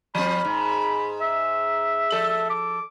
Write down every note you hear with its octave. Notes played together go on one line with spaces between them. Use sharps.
F3 C4 B5
G#2
E5
F3 A4
D6